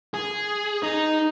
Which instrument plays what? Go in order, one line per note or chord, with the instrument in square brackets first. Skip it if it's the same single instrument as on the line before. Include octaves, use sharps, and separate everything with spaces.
[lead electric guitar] G#4
D#4